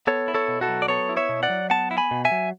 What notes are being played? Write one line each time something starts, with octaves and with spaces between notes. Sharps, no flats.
B3 A4 C#5
E4
A4 C#5
B2
F#4 A4
F#3
D5
B3 A4 C#5
E4
C#5 E5
B2
D5 F#5
F#3
B3 F#5 A5
E4
G#5 B5
B2
E5 G#5
F#3